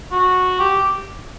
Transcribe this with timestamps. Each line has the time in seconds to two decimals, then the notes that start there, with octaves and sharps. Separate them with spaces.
0.12 F#4
0.60 G4